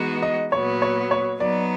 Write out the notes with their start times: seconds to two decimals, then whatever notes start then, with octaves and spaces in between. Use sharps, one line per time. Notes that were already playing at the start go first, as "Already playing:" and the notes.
Already playing: E3 G#3 B3 D#4 F#4
0.22 D#5
0.52 A#2 F#3 B3 C#5
0.82 C#5
1.11 C#5
1.40 F#3 B3 D#4 D5